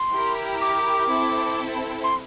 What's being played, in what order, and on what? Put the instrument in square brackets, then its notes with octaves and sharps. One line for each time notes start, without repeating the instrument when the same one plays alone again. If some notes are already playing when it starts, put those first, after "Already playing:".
Already playing: [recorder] C6
[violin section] E4 G4 A#4
[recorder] D6
[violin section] C4 E4 A4
[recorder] C6